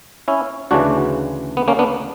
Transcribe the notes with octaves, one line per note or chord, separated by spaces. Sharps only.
C#4 E4
D2 C#3 E3 D4 F#4
B3
A#3 C#4
B3 D4